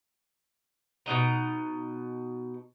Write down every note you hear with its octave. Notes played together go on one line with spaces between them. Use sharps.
B2 C#4 D#4 A#5